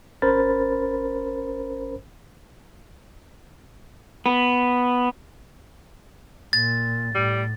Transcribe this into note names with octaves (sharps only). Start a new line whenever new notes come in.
G#1 C#4 A#4 C5 B5 A6
B3
A#2 A6
A2 G3